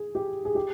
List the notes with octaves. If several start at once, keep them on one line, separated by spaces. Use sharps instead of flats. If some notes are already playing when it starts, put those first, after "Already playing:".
Already playing: G#4
G4
G#4
G4